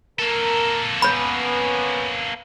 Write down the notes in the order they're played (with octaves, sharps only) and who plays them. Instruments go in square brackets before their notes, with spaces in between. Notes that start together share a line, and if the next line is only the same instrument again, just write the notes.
[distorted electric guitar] A#3 A4 [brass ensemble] A#4
[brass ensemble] B3 C#4 [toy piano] C#5 B5